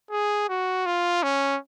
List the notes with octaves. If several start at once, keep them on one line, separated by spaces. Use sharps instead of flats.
G#4
F#4
F4
C#4